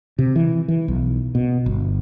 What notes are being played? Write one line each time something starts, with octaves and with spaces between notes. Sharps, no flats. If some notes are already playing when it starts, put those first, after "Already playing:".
C3
E3
E3
B1
B2
G1